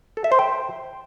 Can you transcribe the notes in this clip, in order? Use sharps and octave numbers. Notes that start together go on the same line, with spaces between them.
A4
E5
C5
G5